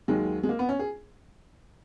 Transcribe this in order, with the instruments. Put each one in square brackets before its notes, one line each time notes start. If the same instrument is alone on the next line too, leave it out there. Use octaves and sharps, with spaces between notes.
[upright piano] D#2 D#3 F#3 G#3
G#3
A#3
B3
C#4
G#4